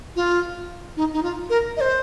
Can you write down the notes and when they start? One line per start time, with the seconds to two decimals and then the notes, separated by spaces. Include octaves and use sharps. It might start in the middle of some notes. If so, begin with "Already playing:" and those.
0.16 F4
0.97 D#4
1.13 D#4
1.23 F4
1.50 A#4
1.77 D#5
1.81 C5